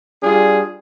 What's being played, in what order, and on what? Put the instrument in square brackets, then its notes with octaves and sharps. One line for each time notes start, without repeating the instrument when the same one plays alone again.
[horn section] G3 D4 F4 G#4